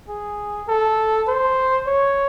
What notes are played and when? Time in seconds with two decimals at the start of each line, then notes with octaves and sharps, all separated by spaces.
0.08 G#4
0.68 A4
1.28 C5
1.87 C#5